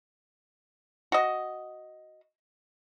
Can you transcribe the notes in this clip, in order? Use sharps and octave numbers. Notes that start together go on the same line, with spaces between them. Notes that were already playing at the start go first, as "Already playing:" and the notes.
F#4 D#5